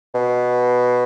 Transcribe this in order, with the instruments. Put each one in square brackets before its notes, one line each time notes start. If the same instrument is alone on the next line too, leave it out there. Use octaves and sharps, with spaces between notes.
[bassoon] B2